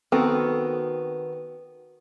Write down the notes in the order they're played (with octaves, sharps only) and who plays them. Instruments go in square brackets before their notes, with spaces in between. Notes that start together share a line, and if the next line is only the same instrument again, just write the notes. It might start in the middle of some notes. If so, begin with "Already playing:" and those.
[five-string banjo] D#3 B3 C4 F#4 A4